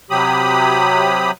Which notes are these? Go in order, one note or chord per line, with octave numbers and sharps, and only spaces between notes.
C3 F#3 G4 B5 D#6